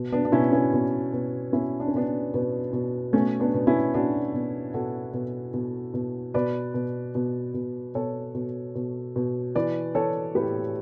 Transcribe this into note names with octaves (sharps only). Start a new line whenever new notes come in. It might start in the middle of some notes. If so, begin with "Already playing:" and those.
Already playing: B2
B3 D4
D4
B2 C#4 E4
C#4 E4
B2
B2
B2 C#4 E4
D4
C#4
B2 B3 D4
B2 B3
B2
B2 A3 C#4
B3 D4
B2
C#4 E4
B2 D4 F#4
B2
B2 F#4 A4
B2
B2
B2
B2 B4 D5
B2
B2
B2
B2 A4 C#5
B2
B2
B2
E3 B4 D5
E3 A4 C#5
A2 G4 B4